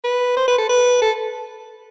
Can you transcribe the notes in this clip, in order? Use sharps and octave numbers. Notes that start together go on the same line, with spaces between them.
B4
C5
B4
A4
B4
A4